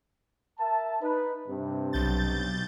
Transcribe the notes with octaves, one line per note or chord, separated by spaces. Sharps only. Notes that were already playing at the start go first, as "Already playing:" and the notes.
A#4 E5 A5
D#4 B4
G2 C3
B1 G6 A6